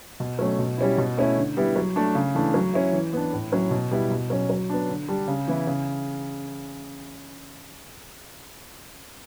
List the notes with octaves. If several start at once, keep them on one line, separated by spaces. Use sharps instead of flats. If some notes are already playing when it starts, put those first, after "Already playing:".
B2
F#3 A3 C#4
B2
G3 C#4 E4
B2
A3 C#4 E4
D3
G3 B3 E4
F#3
A3 D4
C#3
E3 A3 D4
F#3
C#4 E4
E3
B3 D4
A2
F#3 C#4 E4
B2
G3 B3 E4
B2
F#3 C#4
F#3
B3 D4
D3
G3 D4
C#3
E3 B3 E4
C#3